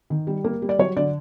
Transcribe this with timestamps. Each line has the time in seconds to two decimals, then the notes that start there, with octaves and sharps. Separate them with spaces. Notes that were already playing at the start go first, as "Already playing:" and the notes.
0.10 D#3
0.27 G3
0.44 A#3
0.62 G3
0.69 D5
0.79 F#3 C#5
0.96 D3 D5